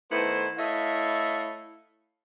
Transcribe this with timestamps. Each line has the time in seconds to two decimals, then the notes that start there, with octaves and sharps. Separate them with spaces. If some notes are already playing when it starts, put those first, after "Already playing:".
0.11 D#3 A3 B3 E4 C5
0.58 A3 E4 C#5 D#5 F5